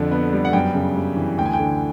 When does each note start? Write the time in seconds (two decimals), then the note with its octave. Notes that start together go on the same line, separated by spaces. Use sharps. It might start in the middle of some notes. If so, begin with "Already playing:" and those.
Already playing: F2 D3
0.11 B3
0.33 G3
0.45 F#5
0.53 F#2 G5
0.74 C#3
0.96 G3
1.17 E3
1.38 D2 G5
1.46 G#5
1.53 G5
1.60 D3